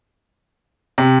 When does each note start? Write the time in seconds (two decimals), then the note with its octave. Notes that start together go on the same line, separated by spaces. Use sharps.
0.98 C3